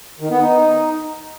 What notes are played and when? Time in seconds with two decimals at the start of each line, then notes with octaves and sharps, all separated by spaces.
0.20 D#3
0.31 B3
0.41 D#4